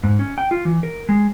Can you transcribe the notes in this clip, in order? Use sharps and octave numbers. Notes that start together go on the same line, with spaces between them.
G#2
C#4
G5
F4
E3
A#4
G#3